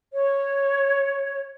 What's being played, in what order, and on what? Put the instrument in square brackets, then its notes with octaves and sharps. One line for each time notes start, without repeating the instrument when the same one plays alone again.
[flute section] C#5